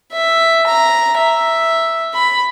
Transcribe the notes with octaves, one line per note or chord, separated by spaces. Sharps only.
E5
A#5
E5
B5